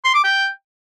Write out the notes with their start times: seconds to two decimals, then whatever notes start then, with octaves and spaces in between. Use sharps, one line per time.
0.04 C6
0.14 D6
0.24 G5